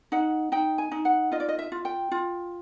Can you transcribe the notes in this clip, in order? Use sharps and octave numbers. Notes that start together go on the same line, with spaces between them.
D#4 F#5
D#4 G5
G#5
D#4
F#5
F4 D#5
D5
D#5
E5
F4
G5
F4